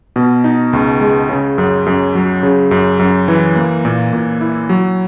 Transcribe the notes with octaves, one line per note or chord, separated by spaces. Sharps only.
B2
D#4
C#2
G#3
C#3
F#2
F#2
F#3
C#3
F#2
F#2
E3
A#3
A#2
A#2
E4
F#3